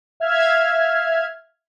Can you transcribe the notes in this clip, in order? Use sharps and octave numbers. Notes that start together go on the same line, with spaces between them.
E5 F5 F6 G#6